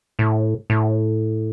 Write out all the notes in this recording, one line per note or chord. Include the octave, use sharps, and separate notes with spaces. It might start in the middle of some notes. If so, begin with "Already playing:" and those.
A2
A2